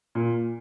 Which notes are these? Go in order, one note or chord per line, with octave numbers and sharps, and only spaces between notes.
A#2